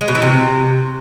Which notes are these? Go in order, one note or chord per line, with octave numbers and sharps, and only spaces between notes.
G#3
B2
E3
C3